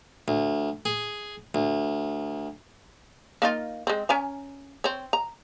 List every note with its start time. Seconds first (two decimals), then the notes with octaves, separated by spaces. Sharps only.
0.28 D2
0.85 G#4
1.55 D2
3.42 A#3 D#4 F4
3.87 G#3 C4
4.09 C#4 G#5 A#5
4.84 C4 C#5
5.13 A#5